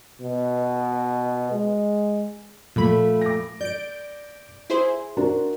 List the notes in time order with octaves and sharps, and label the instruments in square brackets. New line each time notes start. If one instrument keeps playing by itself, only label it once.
[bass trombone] B2
G#3
[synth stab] A#2 B5 [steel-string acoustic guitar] F3 A3
[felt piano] D6 A#6
[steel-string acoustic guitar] D5 [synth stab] G6 D7
[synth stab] E4 G#4 C5
[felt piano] D4 F#4 A#4